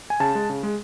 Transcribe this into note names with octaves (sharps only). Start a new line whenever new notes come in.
G#5
C#3 A5
G#3
C#3
G#3